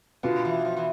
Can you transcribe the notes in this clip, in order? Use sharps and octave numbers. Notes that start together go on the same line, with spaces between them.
B2 D3 B3 F4
E3
F3
E3